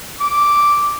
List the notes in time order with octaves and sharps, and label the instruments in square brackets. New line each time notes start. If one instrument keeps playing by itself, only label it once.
[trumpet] D6